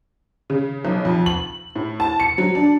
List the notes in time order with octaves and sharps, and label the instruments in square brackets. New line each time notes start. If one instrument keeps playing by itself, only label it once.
[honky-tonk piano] C#3
B1
F2
F#7
A2
A5
C#7
F#3
D4